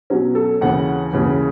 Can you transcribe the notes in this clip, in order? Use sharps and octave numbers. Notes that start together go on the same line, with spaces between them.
B2 F#3 C#4
A4
D#2 C#3 E3 F#5
D#2 C#3 E3